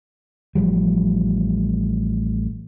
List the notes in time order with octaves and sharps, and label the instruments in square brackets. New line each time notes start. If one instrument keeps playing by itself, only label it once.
[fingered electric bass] A1 F3 G3